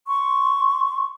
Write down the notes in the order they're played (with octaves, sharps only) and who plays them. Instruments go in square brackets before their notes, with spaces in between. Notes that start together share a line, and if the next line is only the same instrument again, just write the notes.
[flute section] C6 C#6